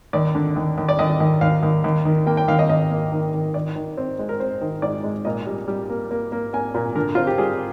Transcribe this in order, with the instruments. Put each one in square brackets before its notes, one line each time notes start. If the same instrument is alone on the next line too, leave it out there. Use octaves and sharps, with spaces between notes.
[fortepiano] D#2 D5
D3
D#2
D#2
D5
D#2 D#5
D#2
D#2 F5
D#2
D#2
D#3
A#3 G5
G5
D#2 F5
D#5
D#2 D#5
A#3
D#3
D#3
D#3 D5
D#3
C4
G#3
A#4
C4 C5
D#3
G#2 D5
G#3
A#2 D#5
G3
G3
A#3
A#3
A#3
A#3 G#5
A#2
D3 A#4
C4 F4
G4
G3 G#4